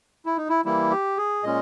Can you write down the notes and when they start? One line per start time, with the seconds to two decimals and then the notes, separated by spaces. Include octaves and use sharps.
0.26 E4
0.37 D#4
0.49 E4
0.65 E3 G3 A#3 E4
0.90 G4
1.18 G#4
1.43 A#2 G#3 C#4 D#5